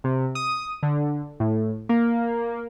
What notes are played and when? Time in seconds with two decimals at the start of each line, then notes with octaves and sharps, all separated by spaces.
0.04 C3
0.35 D#6
0.83 D3
1.40 A2
1.89 A#3